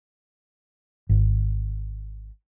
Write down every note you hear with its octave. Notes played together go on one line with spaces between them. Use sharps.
G#1